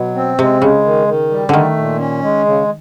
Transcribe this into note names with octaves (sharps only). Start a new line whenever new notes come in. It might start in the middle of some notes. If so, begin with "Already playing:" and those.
Already playing: B2 F#3
C4
C3 G#3
C#3 G#3
D#3
D#3
G3
D3 D#3 A3
A#2
C#4
G#3
C#3